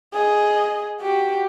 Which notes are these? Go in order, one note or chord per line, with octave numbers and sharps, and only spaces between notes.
G#4 D#5
F#4 G4